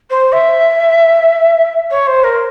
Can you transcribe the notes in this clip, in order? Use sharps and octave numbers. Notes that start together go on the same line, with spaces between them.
C5
E5
C#5
C5
A#4